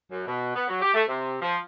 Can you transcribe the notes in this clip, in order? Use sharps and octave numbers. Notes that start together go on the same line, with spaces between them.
F#2
B2
B3
F#3
G4
A3
C3
F3